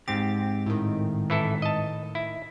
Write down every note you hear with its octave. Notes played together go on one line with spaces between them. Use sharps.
G#2 C4 G4 A6
A2 D#3
E3 E4 A4
D#5 A5
E4